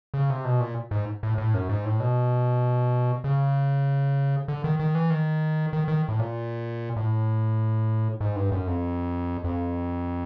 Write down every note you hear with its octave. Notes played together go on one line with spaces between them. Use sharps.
C#3
C3
B2
A#2
G#2
A2
A2
F#2
G#2
A2
B2
C#3
D3
D#3
D#3
E3
D#3
D#3
D#3
A2
A#2
A2
G#2
G2
F#2
F2
F2